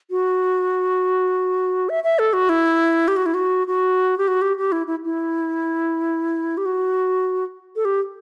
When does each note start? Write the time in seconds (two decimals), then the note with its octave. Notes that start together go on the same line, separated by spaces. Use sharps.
0.11 F#4
1.89 E5
2.04 E5
2.19 A4
2.33 F#4
2.49 E4
3.08 G4
3.16 F#4
3.26 E4
3.34 F#4
3.67 F#4
4.18 G4
4.28 F#4
4.42 G4
4.57 G4
4.72 E4
4.87 E4
5.04 E4
6.57 G4
6.66 F#4
7.76 A4
7.85 G4